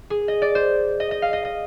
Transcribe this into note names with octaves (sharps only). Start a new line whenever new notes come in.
G#4
D#5
D5
C5
D#5
D#5
F5
D#5
D#5